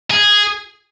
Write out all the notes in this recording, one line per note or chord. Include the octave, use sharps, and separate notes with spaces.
G#4